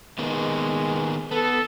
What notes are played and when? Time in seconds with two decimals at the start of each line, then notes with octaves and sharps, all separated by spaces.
0.19 D#3 G#3 A#3 B3
1.31 B3 A4